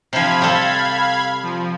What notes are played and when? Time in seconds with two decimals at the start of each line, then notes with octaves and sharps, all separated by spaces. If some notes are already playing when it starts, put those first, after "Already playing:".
0.13 C3 F3 F5 B5 G#6
0.42 G3 A4
1.43 F3